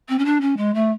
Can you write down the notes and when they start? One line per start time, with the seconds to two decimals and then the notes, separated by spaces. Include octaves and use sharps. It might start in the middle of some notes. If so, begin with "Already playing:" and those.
0.08 C4
0.18 C#4
0.25 D4
0.41 C#4
0.57 G#3
0.74 A3